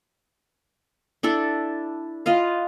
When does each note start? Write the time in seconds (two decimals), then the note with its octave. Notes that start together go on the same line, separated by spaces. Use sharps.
1.23 D4 E4 A4
2.26 F4 B4 D#5 F5